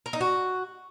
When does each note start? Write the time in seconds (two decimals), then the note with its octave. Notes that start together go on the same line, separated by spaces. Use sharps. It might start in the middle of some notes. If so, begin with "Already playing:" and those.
0.06 A#4
0.13 D#4
0.21 F#4